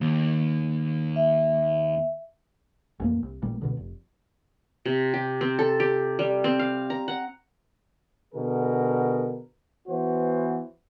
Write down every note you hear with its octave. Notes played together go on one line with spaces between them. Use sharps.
D#2
E5
A1 F2 A#3
C2
A1 A#2 G3
C#2 B2 D3
F1
C3
G4
C4
A4
G4
G3
C4
F5
A#5
F#5
B2 D3 G#4 A#4
E3 B3 F#4 C5